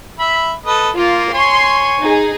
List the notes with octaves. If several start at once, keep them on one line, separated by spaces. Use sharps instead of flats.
E5 B5
A4 B4 D#5
A#3 F4
C#5 G#5 C6 C#6
D#4 G#4